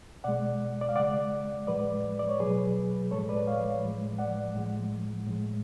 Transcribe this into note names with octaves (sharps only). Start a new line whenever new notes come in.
B2 G#3 D5 F#5
D5
F5
C#3 G#3 D5 F#5
A2 F3 G#3 B4 D5
D5
C#5
B2 F#3 G#4 B4
A2 F3 G#3 A4 C#5
B4 D5
C#5 F5
A2 F3 G#3
D5 F#5
A2 F3 G#3
A2 G#3